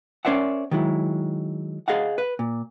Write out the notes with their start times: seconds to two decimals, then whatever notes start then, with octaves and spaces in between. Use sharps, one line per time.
0.25 C#4 A#4 C5 D5 E5 F#5
0.71 D#3 F#3 G#3 E4
1.88 G#4 D#5 F5 F#5
2.18 B4
2.39 A#2